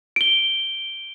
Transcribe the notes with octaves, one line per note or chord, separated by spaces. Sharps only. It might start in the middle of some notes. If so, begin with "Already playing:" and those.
D7 G7